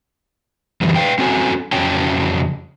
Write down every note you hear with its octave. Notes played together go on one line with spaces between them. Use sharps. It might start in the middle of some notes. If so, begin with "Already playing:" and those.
F#2 D3 E3 G3
B4 F5 G5
C4 C#4 F#4 A4 G#5
F2 C#3 F#3 C#4 G5 A5